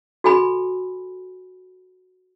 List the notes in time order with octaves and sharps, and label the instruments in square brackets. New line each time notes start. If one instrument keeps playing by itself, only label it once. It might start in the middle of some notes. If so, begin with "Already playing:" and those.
[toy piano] F#4 A4 G#5 B5